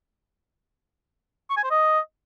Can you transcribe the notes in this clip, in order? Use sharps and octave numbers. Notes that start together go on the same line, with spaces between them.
C#6
G#5
C5
D#5